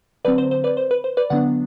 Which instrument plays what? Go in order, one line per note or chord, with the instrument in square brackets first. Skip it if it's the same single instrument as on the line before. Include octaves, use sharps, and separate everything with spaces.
[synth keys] D3 F#3 C4 B4 D5
C5
C5
B4 D5
C5
B4
C5
B4 D5
D3 F#3 B3 D4 D5 F#5